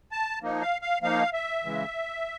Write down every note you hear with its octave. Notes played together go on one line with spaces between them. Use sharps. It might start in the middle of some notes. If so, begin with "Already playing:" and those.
A5
F3 A#3 D#4
F5
F5
F3 A#3 D#4 F5
E5
C#3 E3 G#3